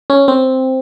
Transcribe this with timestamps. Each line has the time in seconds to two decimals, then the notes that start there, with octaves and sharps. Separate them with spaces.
0.10 C#4
0.28 C4